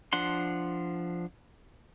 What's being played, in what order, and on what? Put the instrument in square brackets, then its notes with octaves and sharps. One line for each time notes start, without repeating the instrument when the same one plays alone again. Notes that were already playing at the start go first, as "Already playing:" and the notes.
[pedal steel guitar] F3 D4 F#5 C6